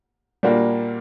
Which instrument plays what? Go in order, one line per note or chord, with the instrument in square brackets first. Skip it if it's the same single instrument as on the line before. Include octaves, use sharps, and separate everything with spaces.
[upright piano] A#2 G3 A#3 D4 F#4